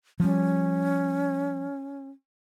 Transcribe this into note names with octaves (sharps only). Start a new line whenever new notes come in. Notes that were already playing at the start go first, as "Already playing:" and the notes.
F3 G3 C#4